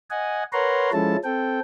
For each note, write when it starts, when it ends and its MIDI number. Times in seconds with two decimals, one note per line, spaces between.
0.10 0.43 75
0.10 0.43 78
0.10 0.43 80
0.53 0.90 70
0.53 0.90 71
0.53 0.90 73
0.53 0.90 78
0.53 0.90 82
0.53 0.90 84
0.93 1.16 53
0.93 1.16 56
0.93 1.16 61
0.93 1.16 64
0.93 1.16 69
0.93 1.16 81
1.24 1.60 60
1.24 1.60 69
1.24 1.60 79